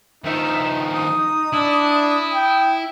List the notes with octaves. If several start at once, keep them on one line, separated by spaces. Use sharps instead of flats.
D#3 F3 D#4 E5
D#6
D4 E4
G5